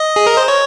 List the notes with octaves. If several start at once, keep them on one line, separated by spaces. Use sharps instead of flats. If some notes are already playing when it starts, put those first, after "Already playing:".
Already playing: D#5
G#4
A#4
C5
C#5